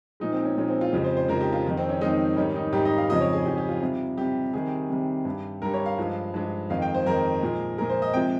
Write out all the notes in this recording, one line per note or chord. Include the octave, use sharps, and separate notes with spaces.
A#2 F3 G#3 D#4
C4
C#4
A#2 F3 G#3 C#4
C4
F4
F2 C#3 F3 G#3 G4
C5
C5
F2 C#3 F3 G#3 A#4
G4
F4
F2 D#3 G#3
C4
C#4
F2 D#3 G#3 D#4
G#2 D#3 G3 C#4
D#4
G#2 D#3 G3 G4
D#5
F5
F2 C#3 F3 G#3 D#5
C#5
G#4
F2 C#3 F3 G#3 G4
G4
F4
C3 G3
C3 G3 G4
C3 D#3 G3 G#4
C3 D#3 G3
G2 G3
G2 G3 A#4
C#5
F5
G2 F3 G#3
G2 F3 G#3
F2 D#3 G#3 F5
G5
C5
F2 D#3 G#3 A#4
A#2 F3 G#3
A#2 F3 G#3 A#4
C5
D#5
C3 F3 G#3 G5